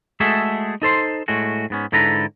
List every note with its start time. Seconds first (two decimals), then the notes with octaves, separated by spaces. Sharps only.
0.20 G#3 A3 F#4 G#4 A4 E5
0.82 D#4 A4 C5 C6
1.28 A2 G#3 A3 F#4
1.70 G#2 B3 C#4
1.92 G#2 D3 E4 A4 B4 A#5